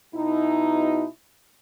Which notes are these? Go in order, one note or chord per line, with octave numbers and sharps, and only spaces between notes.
B2 D#4 E4